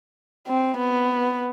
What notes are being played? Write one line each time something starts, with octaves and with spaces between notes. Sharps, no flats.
C4
B3